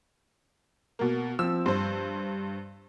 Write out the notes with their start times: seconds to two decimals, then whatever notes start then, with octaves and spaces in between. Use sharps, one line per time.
0.99 B2 A#3
1.39 F3 C4 E6
1.66 G2 C5 C6